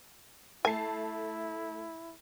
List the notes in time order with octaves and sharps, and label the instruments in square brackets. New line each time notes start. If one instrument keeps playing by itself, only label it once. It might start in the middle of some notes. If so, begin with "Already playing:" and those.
[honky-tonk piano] A3 A5 C7 [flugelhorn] E4 [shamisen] G#5